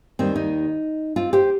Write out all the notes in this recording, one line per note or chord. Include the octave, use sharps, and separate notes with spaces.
D#2 D#3 G3 C4
D#4
C4 F4
G4 C5